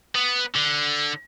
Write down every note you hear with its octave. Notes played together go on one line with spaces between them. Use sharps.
B3
D3